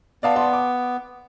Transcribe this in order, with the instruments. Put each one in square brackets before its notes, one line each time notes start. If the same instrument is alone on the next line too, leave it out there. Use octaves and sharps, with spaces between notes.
[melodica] B3 [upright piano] D5 F5 A5
[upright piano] D5 A5 C6
D6